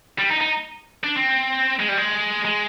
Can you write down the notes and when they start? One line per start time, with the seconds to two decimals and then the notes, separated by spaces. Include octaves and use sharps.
0.19 G3
0.30 D#4
0.41 D#4
1.04 D4
1.15 C4
1.80 G#3
1.89 G3
1.98 G#3
2.45 G#3